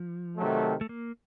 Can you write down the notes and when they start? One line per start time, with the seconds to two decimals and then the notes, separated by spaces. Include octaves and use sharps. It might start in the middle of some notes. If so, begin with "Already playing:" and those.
Already playing: F3
0.37 C3 D#3 F#3 A3
0.81 A3
0.89 A#3